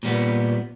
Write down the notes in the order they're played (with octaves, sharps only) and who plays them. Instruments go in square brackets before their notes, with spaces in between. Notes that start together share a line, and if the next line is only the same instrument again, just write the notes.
[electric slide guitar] A#2 G3 B3